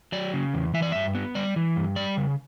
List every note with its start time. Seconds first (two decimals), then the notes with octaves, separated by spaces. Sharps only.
0.12 F#3 D5
0.34 C#3
0.54 E2
0.74 E3 E5
0.82 D5
0.92 G2 E5
1.15 B3
1.35 G3 D5
1.56 E3
1.76 G2
1.96 G3 D5
2.17 C#3